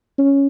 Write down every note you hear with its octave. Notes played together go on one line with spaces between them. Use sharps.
C#4